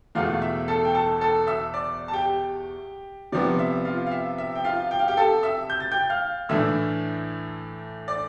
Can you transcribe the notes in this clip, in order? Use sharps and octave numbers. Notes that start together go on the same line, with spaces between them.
E2 B2 A3 F4 F5
E5
A4 A5
G5
A4 A5
A4 A5
E5 E6
D5 D6
A5
G4 G5
C3 F3 B3 D5
E5
F4 F5
F5
E5
E5
G5
F4 F5
G5
F5
G4 G5
A4 A5
E5 E6
G6
A6
G5 G6
F5 F6
A2 E3 A3 D4 E5 E6
D5 D6